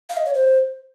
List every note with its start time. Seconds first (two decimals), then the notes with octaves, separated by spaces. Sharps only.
0.10 F5
0.17 D#5
0.26 C#5
0.34 C5